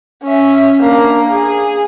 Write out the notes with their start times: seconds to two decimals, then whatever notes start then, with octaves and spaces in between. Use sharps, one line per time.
0.24 C#4 E5
0.80 A#3 D4
1.30 G#4